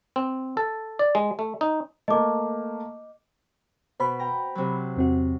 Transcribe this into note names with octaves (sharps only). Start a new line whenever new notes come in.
C4
A4
D5
G#3
A3
D#4
A3 A#3 D#5 D6
B2 C5 B5
G5 A#5
C3 F#3
E2 C4 F#4